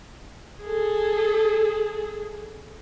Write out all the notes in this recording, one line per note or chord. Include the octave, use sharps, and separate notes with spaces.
G#4 A4